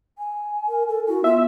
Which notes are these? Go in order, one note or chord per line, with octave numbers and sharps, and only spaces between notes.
G#5
A#4
A4
E4 F#4
B3 F4 E5